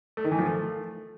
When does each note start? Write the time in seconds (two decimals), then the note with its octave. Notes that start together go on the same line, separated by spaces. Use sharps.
0.17 A3
0.24 D#3
0.32 E3
0.39 F3
0.46 A3